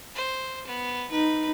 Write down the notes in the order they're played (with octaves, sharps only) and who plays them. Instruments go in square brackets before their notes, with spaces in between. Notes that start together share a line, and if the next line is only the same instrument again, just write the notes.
[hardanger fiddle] C5
B3
[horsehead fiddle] D#4 [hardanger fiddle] B4